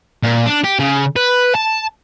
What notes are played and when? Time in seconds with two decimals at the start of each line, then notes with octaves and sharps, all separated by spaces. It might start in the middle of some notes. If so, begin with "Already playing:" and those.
0.23 A#2
0.46 D4
0.64 G4
0.80 C#3
1.16 B4
1.55 A5